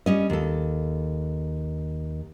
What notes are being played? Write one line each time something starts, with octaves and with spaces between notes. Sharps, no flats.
G3 C#4 D#5
D#2 A4